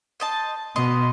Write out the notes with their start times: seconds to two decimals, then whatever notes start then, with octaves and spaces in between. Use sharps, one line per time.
0.20 C5 D#5 A5
0.76 B2 D#5 C6